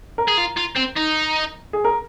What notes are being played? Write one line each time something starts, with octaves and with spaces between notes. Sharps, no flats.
A#4
G#4
F4
F4
C4
D#4
G#4
A#4